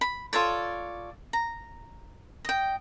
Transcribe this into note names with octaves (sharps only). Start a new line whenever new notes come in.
B5
F4 A4 C#5 D5
A#5
D#5 G5